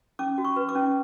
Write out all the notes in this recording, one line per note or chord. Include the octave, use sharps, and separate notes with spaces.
C#4 D6
F#4
C#6
B4
D6
C#4